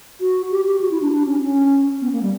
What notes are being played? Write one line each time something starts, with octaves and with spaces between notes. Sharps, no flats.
F#4
G4
G4
F#4
E4
D4
D4
C#4
C#4
B3
A#3
G3